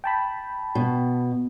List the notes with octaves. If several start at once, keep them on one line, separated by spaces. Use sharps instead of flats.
G5 A5 B5
B2